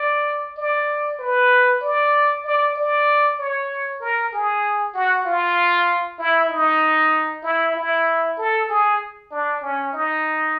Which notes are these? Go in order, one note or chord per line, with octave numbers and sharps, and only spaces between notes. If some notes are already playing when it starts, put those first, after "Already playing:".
Already playing: D5
D5
B4
D5
D5
D5
C#5
A#4
G#4
F#4
F4
E4
D#4
E4
E4
A4
G#4
D4
C#4
D#4